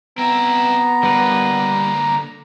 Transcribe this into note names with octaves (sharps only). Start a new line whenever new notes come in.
B3 C4 E4 A#5
D3 G3 A#3 B4